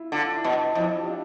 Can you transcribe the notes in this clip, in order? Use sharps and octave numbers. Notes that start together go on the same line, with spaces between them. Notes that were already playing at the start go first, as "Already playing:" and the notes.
Already playing: E4 F4
D3 D4 F4
E4
B2 D4
F2 E4
G4
D4 F4